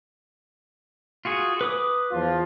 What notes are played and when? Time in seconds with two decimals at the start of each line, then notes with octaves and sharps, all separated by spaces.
1.25 F4 F#4 G#4
1.61 B4 D6 D#6
2.11 E2 F3 F4